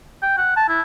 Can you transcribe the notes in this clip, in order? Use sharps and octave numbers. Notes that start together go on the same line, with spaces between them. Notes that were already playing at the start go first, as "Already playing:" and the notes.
G5
F#5
A5
E4